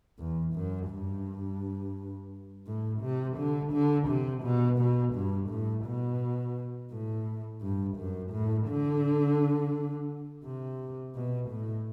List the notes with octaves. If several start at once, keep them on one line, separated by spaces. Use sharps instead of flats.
E2
F#2
G2
A2
C3
D3
D3
C3
B2
B2
G2
A2
B2
A2
G2
F#2
A2
D3
C3
B2
A2